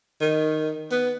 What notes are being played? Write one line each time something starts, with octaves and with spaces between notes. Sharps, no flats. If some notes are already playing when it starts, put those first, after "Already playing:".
D#3
B3